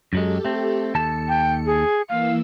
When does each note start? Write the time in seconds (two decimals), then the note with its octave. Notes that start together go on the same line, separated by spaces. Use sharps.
0.13 F#2 F#3 G#3 G4 A4
0.45 A3 C4
0.95 D#2 A4 A5 C#7
1.29 G5
1.66 G#4
2.09 E3 A#3 F5 E6